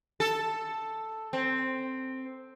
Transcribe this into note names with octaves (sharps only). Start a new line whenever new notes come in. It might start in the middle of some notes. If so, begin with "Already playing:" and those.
A4
C4